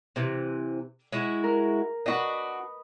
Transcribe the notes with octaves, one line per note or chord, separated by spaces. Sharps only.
C3 E3
G#3 E4 F#4
A#4
D4 F#4 B4 D#5